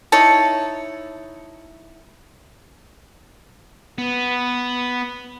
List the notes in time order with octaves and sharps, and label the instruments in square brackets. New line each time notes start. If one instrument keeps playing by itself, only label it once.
[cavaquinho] D#4 E4 C#5 A5
[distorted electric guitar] B3